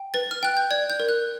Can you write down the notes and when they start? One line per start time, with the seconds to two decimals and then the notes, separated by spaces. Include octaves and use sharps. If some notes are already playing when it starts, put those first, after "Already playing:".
Already playing: G5
0.14 B4 A6
0.31 F6
0.43 G5 F#6
0.57 G6
0.71 D5 G#6
0.90 G6
1.00 A#4
1.09 F#6